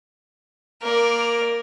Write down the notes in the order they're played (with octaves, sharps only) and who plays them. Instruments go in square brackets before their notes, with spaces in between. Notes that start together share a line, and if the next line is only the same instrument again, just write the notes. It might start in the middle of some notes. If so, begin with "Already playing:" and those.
[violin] A#3 D5 [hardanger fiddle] A#4